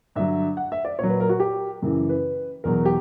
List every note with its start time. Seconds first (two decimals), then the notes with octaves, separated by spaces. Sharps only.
0.16 G2 D3 F#3 E5
0.57 F#5
0.72 E5
0.85 D5
0.99 A#2 F#3 C#5
1.09 B4
1.20 A#4
1.29 F#4
1.40 G4
1.82 F#2 C#3 E3
2.09 B4
2.64 E2 B2 F#3 A#4
2.85 G4